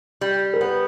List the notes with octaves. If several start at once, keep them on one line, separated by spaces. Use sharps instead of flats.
G3
A#4
B3 B4